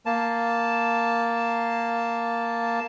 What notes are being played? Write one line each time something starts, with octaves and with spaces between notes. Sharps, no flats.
A#3 A5